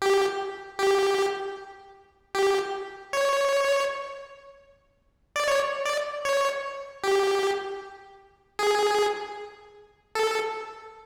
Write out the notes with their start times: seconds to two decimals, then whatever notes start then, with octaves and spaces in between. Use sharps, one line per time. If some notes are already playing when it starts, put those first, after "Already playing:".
0.02 G4
0.79 G4
2.35 G4
3.13 C#5
5.36 D5
5.48 C#5
5.85 D5
6.25 C#5
7.04 G4
8.59 G#4
10.15 A4